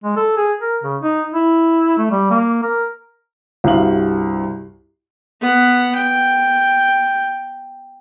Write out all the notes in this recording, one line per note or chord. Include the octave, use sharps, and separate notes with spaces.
G#3
A4
G#4
A#4
C#3
D#4
E4
A3
G3
A#3
A#4
C2 G2 F#4 F5 F#7
B3 F#5
G5